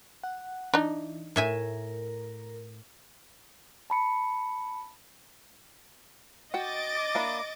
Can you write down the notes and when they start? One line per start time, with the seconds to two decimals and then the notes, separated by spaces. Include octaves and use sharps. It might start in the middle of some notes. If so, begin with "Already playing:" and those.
0.24 F#5
0.74 E3 D4 D#4
1.36 A2 A#4 E5 G#5
3.90 A5 B5 C#7
6.54 F#4 D#5 G5 D6 A6
7.15 A#3 D4 E4